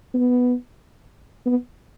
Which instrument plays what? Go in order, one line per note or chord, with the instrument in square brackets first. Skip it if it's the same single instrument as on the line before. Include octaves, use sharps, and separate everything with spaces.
[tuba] B3
B3